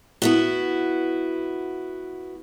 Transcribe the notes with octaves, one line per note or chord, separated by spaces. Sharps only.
B3 E4 F#4